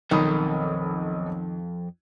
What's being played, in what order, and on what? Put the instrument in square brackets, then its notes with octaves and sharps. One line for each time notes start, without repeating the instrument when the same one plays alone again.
[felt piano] B1 B5 D#6 [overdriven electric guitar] F2 [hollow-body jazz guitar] D#3